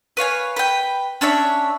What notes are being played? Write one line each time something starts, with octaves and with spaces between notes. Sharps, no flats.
B4 C#5 F5 G#5
B4 G5
C#4 D4 C#5 E5